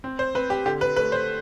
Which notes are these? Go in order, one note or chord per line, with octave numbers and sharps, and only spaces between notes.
C4
C5
C4 B4
G4
D3 G4
B4
A3 B4
C5